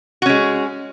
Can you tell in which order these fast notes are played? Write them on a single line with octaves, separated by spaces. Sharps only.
F#4 C#4 G#3